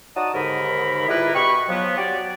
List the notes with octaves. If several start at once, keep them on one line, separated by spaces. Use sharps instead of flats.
D#4 F#4 D5 A5 D#6
D#2 G#2 D3 G4 A#4 B5
G3 E4 F4 G#4 A#4 B4
B2 G4 B5 C#6
F3 F#3 B3
F#4 G4 C#5 D5